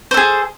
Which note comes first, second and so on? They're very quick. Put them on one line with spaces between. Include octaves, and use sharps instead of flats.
C5 A4 G#4